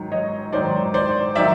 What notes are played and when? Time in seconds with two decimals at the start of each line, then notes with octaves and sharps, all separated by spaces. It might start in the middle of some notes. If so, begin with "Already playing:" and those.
Already playing: G#2 D#3 F#3
0.12 C#5 D#5
0.52 G#2 D#3 F#3 C5 D5
0.94 C5 D5
1.35 D#3 F#3 D5 E5